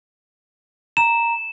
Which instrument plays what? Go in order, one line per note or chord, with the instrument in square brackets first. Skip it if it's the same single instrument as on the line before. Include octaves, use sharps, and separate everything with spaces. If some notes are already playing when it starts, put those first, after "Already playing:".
[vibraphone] A#5 [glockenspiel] E7